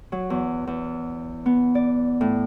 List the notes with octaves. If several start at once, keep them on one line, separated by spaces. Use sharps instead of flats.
F#3
E2
E2
B3
D5
A2